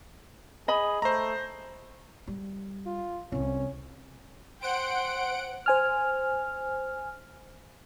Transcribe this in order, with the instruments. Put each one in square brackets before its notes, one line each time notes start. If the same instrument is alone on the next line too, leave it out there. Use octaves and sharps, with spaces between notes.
[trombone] G#4 [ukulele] D#5 B5
[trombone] A3 [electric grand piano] C5 A#5
[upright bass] G3
[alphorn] F4
[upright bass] C2 E3 [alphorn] C#4
[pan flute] C5 [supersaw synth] F#5 D7 [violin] G5 C6
[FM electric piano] C5 G#5 F6